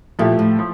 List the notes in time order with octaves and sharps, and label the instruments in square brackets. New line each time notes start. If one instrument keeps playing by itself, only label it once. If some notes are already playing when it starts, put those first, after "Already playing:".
[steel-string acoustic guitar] A#2 [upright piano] F3 A3 E4 G4
[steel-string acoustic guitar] A2
[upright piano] F3